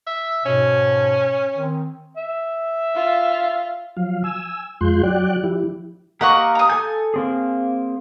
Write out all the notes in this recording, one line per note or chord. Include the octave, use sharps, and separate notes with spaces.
E5
G#2 B2 C#4
D#3 C4
E5
F4
F3 F#3 F5
G#5 E6
F2 G#3 F4 C6 F#6 G6
F#3 F#4 D5 G5 F#6
F3 E4 G4
A#3 G4 A#4 D#5 F#5 C#6
A#5 D#6
A4 G#5 G6
A#3 C4 G#4